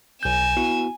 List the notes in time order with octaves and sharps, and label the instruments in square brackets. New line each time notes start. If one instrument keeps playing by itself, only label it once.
[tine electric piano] B1 G6 [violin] G#5 E7
[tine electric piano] B3 E4 F#4